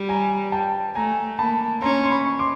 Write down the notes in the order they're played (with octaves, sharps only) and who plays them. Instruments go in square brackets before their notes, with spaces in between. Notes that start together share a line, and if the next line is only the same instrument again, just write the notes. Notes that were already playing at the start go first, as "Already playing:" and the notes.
Already playing: [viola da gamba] G3
[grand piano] G#5 A#5
G5 A5
[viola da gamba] A3 [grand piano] G#5 A#5
[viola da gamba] A#3 [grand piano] A5 B5
[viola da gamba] C#4 [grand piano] A#5 C6
[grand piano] C6
B5 C#6
C6 D6